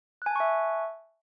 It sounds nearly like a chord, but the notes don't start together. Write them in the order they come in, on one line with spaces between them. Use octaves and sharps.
F#6 G#5 A5 C#6 E5